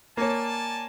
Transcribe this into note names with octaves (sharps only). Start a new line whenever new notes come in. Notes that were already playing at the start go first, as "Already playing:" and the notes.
A#3 C#5 D5 G#5 A5